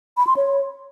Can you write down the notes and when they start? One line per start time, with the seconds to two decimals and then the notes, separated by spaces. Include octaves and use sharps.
0.17 B5
0.27 C6
0.37 C#5